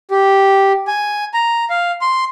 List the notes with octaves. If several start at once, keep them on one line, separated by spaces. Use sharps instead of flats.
G4
G#5
A#5
F5
C6